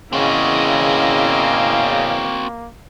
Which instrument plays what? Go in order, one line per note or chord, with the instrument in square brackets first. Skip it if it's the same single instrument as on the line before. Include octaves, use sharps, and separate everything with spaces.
[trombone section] E2 C#3 [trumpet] A#3 [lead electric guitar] C4 F#4 [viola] E4 D#5